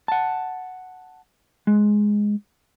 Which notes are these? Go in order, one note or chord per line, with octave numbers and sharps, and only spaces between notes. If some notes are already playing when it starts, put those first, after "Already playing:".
F#5 A5
G#3